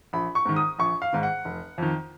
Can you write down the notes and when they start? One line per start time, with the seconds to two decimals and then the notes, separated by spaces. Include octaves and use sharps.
0.13 A#1 B5
0.35 C#6
0.45 G#2 D#3
0.56 D#6
0.79 A#1 C#6
1.02 F5
1.13 G#2 D#3
1.23 F#5
1.45 F1
1.78 F2 D#3